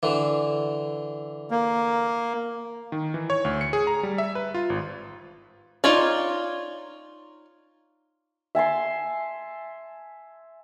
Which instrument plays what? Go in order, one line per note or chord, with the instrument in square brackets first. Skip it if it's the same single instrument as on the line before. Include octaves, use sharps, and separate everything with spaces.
[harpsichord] D3 E3
[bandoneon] A#3
[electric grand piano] D#3
E3
C#5
D2
C#7
G#4
A#5
G3
E5
B4
F4
G#1
[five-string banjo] D#4 F4 C#5 D5
[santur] E5 G#5 A5 C6